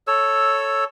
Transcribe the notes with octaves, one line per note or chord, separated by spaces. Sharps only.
A4 C#5 E6